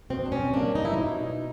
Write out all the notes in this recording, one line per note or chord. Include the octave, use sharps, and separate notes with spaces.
B2 C4
D4
C#4
G3 A#3 D4
D#4
E4
B2 D#4